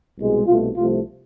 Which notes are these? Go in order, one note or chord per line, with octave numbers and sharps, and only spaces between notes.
C2 B2 G#3
C2 B2 A3 F4
C2 C3 F3 A3 F4